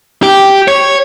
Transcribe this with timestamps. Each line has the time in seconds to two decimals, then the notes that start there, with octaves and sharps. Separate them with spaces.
0.23 G4
0.68 C#5